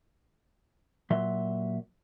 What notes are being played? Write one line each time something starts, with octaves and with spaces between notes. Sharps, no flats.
A#2 F#3 E5 C6